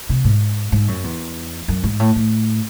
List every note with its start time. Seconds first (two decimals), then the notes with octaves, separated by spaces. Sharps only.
0.09 C3
0.24 G#2
0.72 G#2
0.88 F#2
1.04 E2
1.68 F#2
1.83 G#2
2.00 A2
2.16 A2